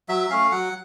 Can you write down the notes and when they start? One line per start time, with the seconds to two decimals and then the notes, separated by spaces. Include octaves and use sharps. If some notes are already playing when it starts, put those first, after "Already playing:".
0.09 F#3 E5
0.30 A3 C#4 F5
0.52 F#3 F#5